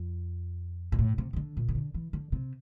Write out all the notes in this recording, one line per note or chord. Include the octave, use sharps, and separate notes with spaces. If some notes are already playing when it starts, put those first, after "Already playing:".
Already playing: F2
A#2
A2
C3
C3
D3
A#2
C3
D3
E3
D3
C3